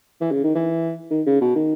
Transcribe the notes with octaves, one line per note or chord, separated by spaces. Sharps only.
E3
C#3
D#3
E3
D#3
C#3
B2
D#3